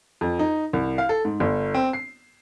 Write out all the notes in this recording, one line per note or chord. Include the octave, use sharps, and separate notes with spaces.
F2
D#4
C2
F5
A4
G#2
G1
C4
C7